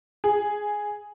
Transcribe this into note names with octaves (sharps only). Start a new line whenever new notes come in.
G#4